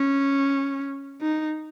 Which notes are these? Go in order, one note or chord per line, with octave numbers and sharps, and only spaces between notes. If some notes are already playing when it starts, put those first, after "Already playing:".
Already playing: C#4
D#4